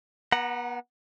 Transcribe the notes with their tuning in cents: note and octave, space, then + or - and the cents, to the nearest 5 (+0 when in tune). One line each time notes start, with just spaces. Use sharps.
B3 -35 F#5 +0 A#5 +0